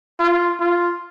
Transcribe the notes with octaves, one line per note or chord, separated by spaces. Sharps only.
F4
F4